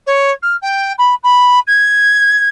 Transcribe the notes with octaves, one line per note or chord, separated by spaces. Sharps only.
C#5
F6
G5
B5
B5
G#6